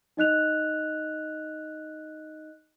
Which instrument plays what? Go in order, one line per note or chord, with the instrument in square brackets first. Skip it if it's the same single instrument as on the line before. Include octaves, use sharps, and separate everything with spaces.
[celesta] D#4 D#5 F#6 F7